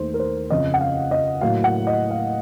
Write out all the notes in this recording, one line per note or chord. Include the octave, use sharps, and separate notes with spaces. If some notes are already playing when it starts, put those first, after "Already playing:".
Already playing: D#2 D#3 A3 C5
A#4
C5
F2 C#3 F3 D#5
F#5
F5
D#5
A2 F#3 A#3 F5
F#5
D#5
F5